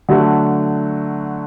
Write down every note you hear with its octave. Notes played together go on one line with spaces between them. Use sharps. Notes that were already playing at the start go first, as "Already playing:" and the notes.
D3 F#3 A3